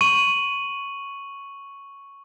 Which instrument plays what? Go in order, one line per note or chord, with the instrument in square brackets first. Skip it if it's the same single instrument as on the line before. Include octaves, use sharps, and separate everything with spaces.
[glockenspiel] C#6 D#7 F#7